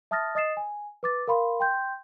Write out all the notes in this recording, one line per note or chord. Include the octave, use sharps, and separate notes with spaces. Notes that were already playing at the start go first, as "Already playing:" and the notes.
E5 A5 D#6 F6 A6 A#6
D#5 D#6 A6 C7 E7
G#5
B4 D6 A6
A#4 F5 B5 C6
G5 C6 G6